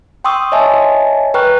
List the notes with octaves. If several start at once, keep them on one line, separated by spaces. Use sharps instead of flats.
G5 C6 C#6 D#6 E6
C#5 D#5 E5 G#5 A5
B4 G5 A#5 C#6 F6 F#6